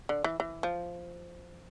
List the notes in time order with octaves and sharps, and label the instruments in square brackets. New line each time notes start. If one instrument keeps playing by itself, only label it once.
[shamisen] D3
E3
E3
F3